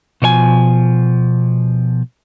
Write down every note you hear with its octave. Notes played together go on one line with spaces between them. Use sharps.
B2 F3 C#5 G#5